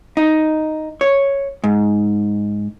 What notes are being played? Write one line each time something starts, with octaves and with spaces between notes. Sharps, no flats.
D#4
C#5
G#2